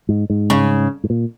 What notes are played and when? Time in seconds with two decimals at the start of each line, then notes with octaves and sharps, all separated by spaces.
0.09 G#2
0.30 G#2
0.50 C#3
1.04 G#2
1.10 A#2